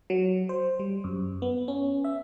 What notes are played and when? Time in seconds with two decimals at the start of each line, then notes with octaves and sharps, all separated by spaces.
0.10 F#3
0.49 C5
0.79 G3
1.04 F#2
1.42 B3
1.68 C#4
2.04 E5